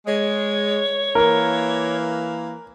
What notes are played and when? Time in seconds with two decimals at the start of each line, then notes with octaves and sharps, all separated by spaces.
0.06 G#3 C#5
1.15 E3 A#3 A#4